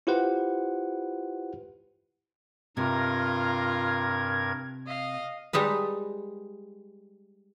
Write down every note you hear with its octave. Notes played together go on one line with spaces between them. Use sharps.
E4 F4 G4 B4 C5 F#5
G2 C3 F4 A#4 A#5 G#6
D#5 F5
G3 G#3 D#4 B4